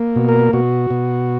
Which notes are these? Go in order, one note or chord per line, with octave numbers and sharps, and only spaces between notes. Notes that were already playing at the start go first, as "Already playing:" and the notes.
Already playing: A#3
B2
A#4
B2 F#4
B2